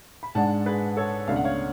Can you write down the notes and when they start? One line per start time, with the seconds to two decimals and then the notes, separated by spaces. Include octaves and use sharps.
0.23 B5
0.35 G#2 G#3 D4 F#5 A5
0.66 G#4 B4
0.97 A4 C#5
1.28 C#2 B2 A3 D4 F5
1.36 F#5
1.44 C#5 F5